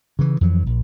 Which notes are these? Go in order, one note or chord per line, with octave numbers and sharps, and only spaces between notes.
C#3 E3
F2 E3 F#3
A#1